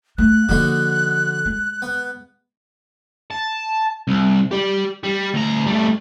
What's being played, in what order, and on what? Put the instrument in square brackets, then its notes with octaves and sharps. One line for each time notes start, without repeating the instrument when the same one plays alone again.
[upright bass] A3 B3 [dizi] F#6
[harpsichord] D3 D#4 F#4 [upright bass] F3 A#3
[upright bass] G#3
[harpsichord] B3
[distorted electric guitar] A5
C2
G4 D5
G3
D2 A#5
G3 A3